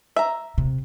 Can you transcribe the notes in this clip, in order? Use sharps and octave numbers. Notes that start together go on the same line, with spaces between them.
E5 A#5
C3